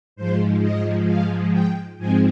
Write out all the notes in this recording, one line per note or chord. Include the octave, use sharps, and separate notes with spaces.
G#2 F3 G#3 C5
D#5
F5
G5
G#2 F3 G#3 C4 G#5